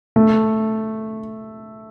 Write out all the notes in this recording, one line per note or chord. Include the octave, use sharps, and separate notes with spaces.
A3